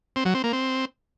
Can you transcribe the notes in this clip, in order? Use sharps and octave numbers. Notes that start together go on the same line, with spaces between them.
C4
F#3
C4
A#3
C4